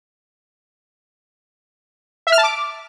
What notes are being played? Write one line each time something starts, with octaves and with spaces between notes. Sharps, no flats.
E5
F6
A5
D6